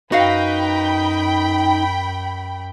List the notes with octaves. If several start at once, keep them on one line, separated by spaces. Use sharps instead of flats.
F#2 D#4 F#4 B4 F5 G5 B5